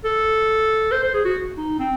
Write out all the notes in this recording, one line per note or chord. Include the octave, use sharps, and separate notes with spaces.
A4
C5
C5
G#4
F#4
D#4
C4